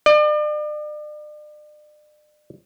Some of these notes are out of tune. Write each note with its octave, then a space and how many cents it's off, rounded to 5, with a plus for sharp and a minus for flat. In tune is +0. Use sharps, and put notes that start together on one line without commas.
D5 +40